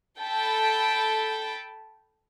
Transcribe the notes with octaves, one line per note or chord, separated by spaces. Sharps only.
A4 G5 A5 B5